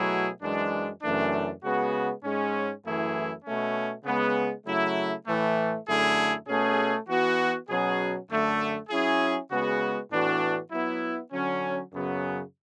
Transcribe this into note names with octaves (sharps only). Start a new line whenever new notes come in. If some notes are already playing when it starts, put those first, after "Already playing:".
Already playing: B2 F#3 A3 E4 G#4
F#2 E3 G#3 D4
F#2 C#3 E3 A3 D4
C#3 G#3 B3 F#4
G#2 G#3 C#4
F#2 E3 A3 E4 G#4
B2 A3 C#4
C#3 G#3 B3
C#3 F#3 A3 E4
A2 E3 A3
F#2 D3 A3 E4 G#4
B2 A3 C#4 G#4
E3 B3 F#4
B2 F#3 C#4 G#4
F#2 D3 A3
F#3 C#4 E4 G#4
C#3 G#3 B3 F#4
A2 E3 B3 D4 F#4
F#3 B3 E4
D3 F#3 C#4
F#2 C#3 F#3 B3